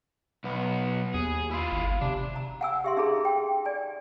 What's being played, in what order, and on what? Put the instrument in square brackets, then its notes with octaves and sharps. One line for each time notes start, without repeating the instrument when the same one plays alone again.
[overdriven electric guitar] B1 B3
[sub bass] D#2 [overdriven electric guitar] G#4
[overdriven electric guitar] E4 F4
[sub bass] G1
[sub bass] C3 [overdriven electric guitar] D4
[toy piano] A#5
F#5 G#5 E6
G4 E5 C6
D#4 G#4 A4 A#5
G5
D5 G#5